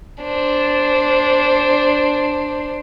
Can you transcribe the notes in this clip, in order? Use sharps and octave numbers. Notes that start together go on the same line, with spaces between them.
D4 C5